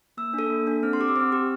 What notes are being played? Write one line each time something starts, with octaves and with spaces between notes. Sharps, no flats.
A#3 E6
D4 A4
A#3
D4 A4
C4 F6
C6
G4 D6
E6
C4 F6
G4